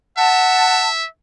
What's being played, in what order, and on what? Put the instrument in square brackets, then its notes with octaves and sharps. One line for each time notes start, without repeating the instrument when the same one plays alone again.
[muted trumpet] E5 [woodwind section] F#5 A5